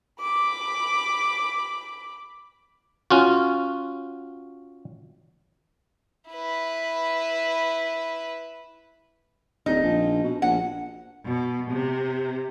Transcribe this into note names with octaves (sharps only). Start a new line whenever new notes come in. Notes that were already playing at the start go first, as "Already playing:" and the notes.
B5 D6
C#4 F4 F#4
E4 B4
D1 D#4
A#1
B2
A#1 F#5
B2
C3